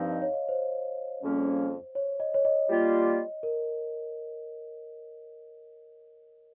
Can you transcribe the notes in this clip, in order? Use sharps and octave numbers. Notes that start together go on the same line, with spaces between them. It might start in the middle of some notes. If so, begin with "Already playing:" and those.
Already playing: G2 F3 C4 D#4 F5
D#5
C#5
D#5
C5
F2 C#3 G3 A#3 C#4
C#5
D#5
C#5
D#5
G3 A#3 F4
A#4